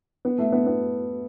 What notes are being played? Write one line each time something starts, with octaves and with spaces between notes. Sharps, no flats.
B3
A3
B3
B3